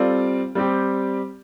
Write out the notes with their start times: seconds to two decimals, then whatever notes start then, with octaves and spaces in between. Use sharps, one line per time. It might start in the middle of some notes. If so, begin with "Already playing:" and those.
Already playing: G3 C4 F4 A4 D5
0.55 G3 C4 G4